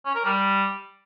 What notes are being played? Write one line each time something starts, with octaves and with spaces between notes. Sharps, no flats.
C#4
A#4
G3